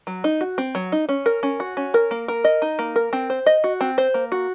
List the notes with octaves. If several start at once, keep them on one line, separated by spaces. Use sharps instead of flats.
F#3
D#4
F#4
C4
F#3
D#4
C#4
A#4
C#4
F#4
C#4
A#4
A#3
A#4
D#5
D#4
A#3
A#4
C4
C5
D#5
F#4
C4
C5
A#3
F#4